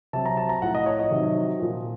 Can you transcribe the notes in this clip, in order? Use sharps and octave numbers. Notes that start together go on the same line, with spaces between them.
C3 F#3 A5
A#5
A5
A#5
A2 F3 F#5
D#5
C#5
D#5
C3 D#3 F#3
A#2 F3